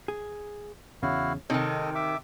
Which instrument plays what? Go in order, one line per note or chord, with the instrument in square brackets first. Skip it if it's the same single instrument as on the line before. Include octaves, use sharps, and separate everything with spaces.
[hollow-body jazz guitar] G#4
[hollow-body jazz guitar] E2 C#3 [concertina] E4 F#4 F5
[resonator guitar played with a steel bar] C3 D#3 [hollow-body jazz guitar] D#4 C#5 [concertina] A4 D#5
[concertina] E5 D6